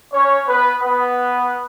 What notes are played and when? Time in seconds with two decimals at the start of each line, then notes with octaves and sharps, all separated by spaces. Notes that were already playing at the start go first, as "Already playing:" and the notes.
0.14 C#4 C#5
0.48 B3 B4
0.82 B3 B4